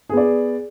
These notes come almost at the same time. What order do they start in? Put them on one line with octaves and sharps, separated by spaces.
G#4 B3 D5